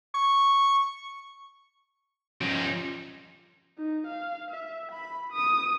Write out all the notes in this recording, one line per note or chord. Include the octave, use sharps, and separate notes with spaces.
C#6
F3 G3 C#4 D#4
D#4
F5
E5
B5
D#6